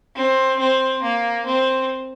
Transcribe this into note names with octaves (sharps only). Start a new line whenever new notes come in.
C4
C4
A#3
C4